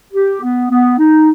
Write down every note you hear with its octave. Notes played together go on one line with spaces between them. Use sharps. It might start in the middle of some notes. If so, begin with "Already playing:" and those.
G4
B3
B3
D#4